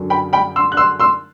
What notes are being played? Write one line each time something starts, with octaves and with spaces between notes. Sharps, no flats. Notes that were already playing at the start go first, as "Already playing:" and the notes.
Already playing: F#2 D3 F#3
G5 B5
G5 B5
C6 E6
F#6
C6 E6
C6 E6